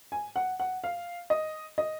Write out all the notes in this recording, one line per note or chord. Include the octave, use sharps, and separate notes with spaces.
G#5
F#5
F#5
F5
D#5
D#5